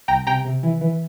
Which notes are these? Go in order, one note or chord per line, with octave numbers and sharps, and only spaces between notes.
C2 G5 A#5
C3 G5 A#5
C3
E3
E3